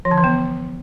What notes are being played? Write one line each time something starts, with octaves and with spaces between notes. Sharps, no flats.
F3
D3
E3
B3